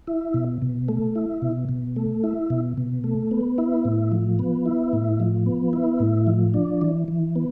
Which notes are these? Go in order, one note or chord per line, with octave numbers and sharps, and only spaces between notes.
E4
B2
B2
A3
E4
B2
B2
A3
E4
B2
B2
A3
B3
E4
A2
F3
B3
E4
A2
F3
B3
E4
A2
F3
D4
E3
E3
B3